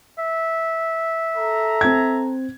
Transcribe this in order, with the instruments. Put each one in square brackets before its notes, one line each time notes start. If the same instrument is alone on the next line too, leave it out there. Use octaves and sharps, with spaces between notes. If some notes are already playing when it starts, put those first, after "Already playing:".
[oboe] E5
[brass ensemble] A4 A#5
[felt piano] C4 G#6